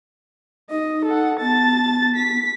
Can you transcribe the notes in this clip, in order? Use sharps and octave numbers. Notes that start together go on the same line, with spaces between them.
D#4 D#5
A4 F#5
B3 A5 A6
B6